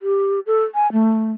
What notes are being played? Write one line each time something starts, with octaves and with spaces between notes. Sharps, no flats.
G4
A4
G#5
A3